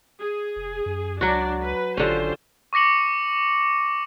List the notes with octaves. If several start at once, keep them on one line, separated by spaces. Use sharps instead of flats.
G#4
F1
F#2
C#2 F#3 D4 F#4 D5
B4
G#1 D3 C#4 F4 G4 C5
C#6 D6 A#6 C#7 F#7